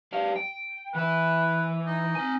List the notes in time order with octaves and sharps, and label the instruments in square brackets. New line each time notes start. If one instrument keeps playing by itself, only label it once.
[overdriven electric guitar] G3 F5
G5
[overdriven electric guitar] E3 E4 [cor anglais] B4
[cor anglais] D#4
[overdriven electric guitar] C4 G#5